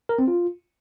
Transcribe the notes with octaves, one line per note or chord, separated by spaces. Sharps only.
A#4
C4
F4